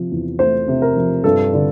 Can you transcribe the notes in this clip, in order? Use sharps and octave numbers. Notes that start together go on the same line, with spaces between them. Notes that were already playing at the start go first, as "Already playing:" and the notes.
Already playing: C3 F3
E2
A3 C5
C3
A#4
F3
G2 A4
D3